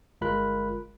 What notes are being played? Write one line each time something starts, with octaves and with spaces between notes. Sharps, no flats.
G1 G#3 F4 A#4 B5 F#6